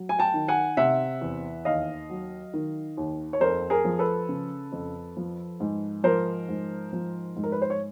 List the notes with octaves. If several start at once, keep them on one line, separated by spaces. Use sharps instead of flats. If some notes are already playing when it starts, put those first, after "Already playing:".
Already playing: F#3
G#5
G5 A5
D#3
F#5 G#5
C3 E5 F#5
E2
D#2 D#5 F5
F#3
D#3
D#2
C#5
F2 A#4 C5
G#4 A#4
F3
A4 B4
C#3
F2
F3
G#2
F3 A#4 C5
G#2
F3
G#2
A#4
B4
C5
C#5